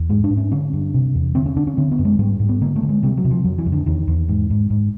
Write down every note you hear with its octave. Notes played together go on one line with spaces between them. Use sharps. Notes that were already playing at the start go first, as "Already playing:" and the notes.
Already playing: E2
G#2 G#3
D4
G#2
C#4
D3 C#4
G2
C3
E2
D3 C4
C#4
D3 D4
C#4
D3 C4
B3
F#2
G#3
G#2 G3
G#2
B3
D3 A#3
A3
D3
G#3
C3 G3
F#3
C3
F3
F2 F#3
E3
F2
D3
E2 D#3
E2
G#2
G#2
G#2